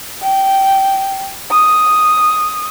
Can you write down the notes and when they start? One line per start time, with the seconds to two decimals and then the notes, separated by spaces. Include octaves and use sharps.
0.22 G5
1.51 D#6